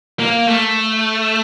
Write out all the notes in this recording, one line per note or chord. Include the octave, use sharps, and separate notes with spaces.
A#3
A3